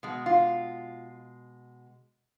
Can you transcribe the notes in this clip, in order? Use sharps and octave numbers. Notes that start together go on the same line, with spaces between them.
B2 G#3
F4